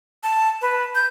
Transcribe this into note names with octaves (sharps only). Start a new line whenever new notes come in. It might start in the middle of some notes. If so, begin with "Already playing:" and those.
A5
B4
G6